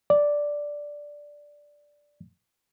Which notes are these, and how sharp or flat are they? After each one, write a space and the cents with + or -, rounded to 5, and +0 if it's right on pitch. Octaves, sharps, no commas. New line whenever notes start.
D5 +0